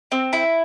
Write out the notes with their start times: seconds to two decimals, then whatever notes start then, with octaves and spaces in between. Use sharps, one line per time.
0.12 C4
0.33 E4